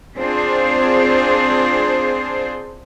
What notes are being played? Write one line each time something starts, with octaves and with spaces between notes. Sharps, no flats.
C4 D4 F4 G#4 C5